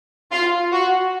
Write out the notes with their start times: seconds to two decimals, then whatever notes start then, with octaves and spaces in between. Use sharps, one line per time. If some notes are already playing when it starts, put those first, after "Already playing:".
0.32 F4
0.72 F#4